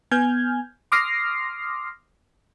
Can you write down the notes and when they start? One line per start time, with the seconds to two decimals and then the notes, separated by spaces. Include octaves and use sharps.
0.11 B3 G#5 F6 G6 G#6
0.92 C6 D6 D#6 F6 A#6 C7